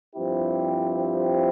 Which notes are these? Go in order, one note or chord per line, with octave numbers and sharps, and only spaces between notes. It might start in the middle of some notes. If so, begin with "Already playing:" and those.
G2 F3 C4 E4 G4